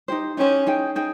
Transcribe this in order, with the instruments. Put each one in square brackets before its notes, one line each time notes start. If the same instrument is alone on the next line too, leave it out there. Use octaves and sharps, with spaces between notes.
[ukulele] D#4 G4 C5
[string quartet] C#4 [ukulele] D#4 G4 C5
[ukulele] D#4 G#4 C5 G5
D#4 G#4 C5 G5